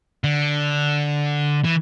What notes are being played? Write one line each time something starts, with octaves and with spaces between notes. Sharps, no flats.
D3
E3